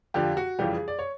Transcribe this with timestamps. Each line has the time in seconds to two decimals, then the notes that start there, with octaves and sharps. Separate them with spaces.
0.14 F2 D3 F3 G4
0.37 F#4
0.59 F2 C#3 E3 G3 G4
0.73 G#4
0.88 D5
0.99 C#5